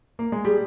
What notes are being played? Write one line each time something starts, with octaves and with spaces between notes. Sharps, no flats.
A#3
G#3
G3 G#4